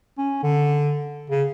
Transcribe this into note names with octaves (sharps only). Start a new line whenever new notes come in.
C#4
D3
C#3